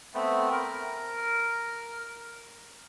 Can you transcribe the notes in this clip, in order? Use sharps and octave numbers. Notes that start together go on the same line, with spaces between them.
A3 B3 C4
A#4